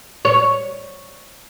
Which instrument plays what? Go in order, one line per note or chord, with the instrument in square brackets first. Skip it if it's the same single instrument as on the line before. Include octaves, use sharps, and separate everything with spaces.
[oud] C#5